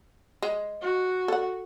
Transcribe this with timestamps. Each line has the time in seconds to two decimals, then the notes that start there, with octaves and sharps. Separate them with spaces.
0.42 G#3
0.82 F#4
1.28 A4 F#5